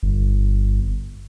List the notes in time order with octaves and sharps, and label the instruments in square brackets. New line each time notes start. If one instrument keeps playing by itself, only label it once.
[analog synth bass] G1